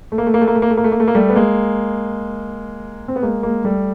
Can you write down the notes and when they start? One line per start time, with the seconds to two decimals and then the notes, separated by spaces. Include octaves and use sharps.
0.12 A3
0.18 A#3
0.27 A3
0.34 A#3
0.41 A3
0.47 A#3
0.55 A3
0.62 A#3
0.70 A3
0.77 A#3
0.84 A3
0.92 A#3
1.00 A3
1.08 A#3
1.15 G3 A3
1.29 B3
1.35 G#3 A#3
3.08 C4
3.16 B3
3.22 G#3 A#3
3.43 G#3 A#3
3.64 G3 A3